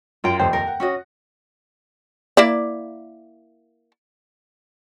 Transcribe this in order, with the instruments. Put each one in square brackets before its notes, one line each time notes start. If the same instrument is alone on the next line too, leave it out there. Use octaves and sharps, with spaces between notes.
[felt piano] F#2 [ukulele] F4 G5
[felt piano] D#1 F2 C3 [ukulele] C5 [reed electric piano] G5
[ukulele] A#4
[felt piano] F#5
[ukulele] C#4 F#4 D#5
[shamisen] A#3 E4 D5